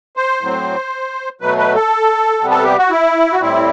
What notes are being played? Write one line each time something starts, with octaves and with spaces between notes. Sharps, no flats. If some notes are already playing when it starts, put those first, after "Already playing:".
C5
A2 F#3 C4
B2 F#3 A3 B4
B4
A4
C3 G3 B3
A4
G4
F#4
E4
F#4
A2 G3 C4 E4